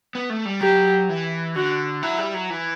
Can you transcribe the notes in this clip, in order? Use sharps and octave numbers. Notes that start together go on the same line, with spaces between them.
B3
A3
G3
F#3 G4
E3
D3 F#4
F#3 E4
G3
F#3
E3